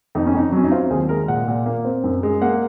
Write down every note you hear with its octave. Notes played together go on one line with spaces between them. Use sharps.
F2 D#4
C#4
F2 D#4
F#3 C#4
D#4
C4 F4
D#2 G#4
G#3 A#4
A#2 F#5
A#2
A#3
C4
F#2
G#3
A#3 F#5